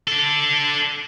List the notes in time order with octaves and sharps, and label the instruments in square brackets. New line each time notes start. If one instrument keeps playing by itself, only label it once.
[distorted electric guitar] D4 A4